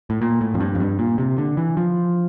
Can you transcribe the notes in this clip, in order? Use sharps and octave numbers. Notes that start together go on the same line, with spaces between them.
A2
A#2
A2
F2
G2
F2
G2
A#2
C3
D3
E3
F3